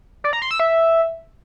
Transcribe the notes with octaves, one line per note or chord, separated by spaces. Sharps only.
D5
A#5
C6
E6
E5